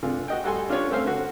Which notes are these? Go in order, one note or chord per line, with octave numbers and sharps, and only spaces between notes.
C3 D4 F4 G#4 A4
F#4 D#5 G5
G3 F#4 A4 G#5 C6
C#4 D4 F4 G4 A4 C#5
A3 C4 C#4 C5 F5
D3 F#4